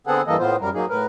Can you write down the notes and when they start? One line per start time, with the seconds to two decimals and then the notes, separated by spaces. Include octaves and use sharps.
0.07 D3 B3 C4 G#4 A4 F#5
0.27 G2 E3 A#3 A4 D#5
0.39 A2 B3 F4 C5
0.61 F#2 G3 A#4
0.74 F#3 A#3 D#4 G#4
0.90 A2 A#4 B4